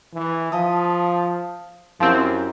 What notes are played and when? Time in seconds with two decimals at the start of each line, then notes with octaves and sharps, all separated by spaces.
0.14 E3
0.52 F3 F5 A5 D#6
2.00 F#2 F3 C4 E4 G4